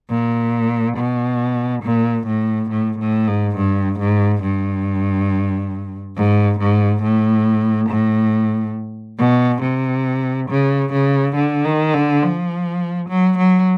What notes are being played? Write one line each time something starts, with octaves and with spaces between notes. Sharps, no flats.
A#2
B2
A#2
A2
A2
A2
G#2
G2
G#2
G2
G#2
G#2
A2
A2
B2
C3
C#3
C#3
D3
D#3
D3
F3
F#3
F#3